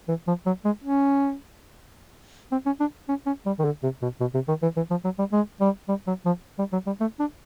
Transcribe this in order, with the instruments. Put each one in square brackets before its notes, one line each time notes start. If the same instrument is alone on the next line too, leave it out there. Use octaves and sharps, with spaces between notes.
[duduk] E3
F3
F#3
G#3
C#4
C4
C#4
D4
C#4
C#4
G3
D#3
D3
C3
B2
B2
C3
D#3
E3
E3
F3
F#3
G3
G#3
G3
G3
F#3
F3
G3
F#3
G3
A3
D4